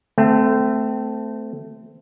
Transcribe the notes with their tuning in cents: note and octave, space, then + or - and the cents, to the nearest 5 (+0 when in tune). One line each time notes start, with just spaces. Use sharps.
A3 +0 C4 -25